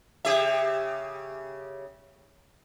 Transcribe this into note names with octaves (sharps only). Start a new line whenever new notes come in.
C#3 G4 E5